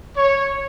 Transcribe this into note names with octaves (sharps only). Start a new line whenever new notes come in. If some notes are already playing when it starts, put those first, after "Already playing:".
C#5